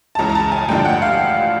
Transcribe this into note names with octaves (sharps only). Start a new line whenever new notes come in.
A5
C#2 C#3 E3 A#5
A#5
A5
G#5
A1 G2 D3 F3 G5
F#5
F5